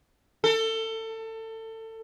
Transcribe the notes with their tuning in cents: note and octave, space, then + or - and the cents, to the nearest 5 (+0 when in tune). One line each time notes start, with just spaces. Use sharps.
A4 +25